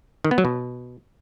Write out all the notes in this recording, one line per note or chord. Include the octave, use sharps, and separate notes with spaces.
D#3
B3
F#3
B2